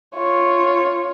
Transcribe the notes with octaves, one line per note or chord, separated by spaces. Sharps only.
F4 C#5